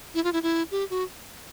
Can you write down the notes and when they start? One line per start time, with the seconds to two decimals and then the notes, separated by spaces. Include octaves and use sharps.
0.14 E4
0.24 F4
0.33 E4
0.43 E4
0.71 G4
0.90 F#4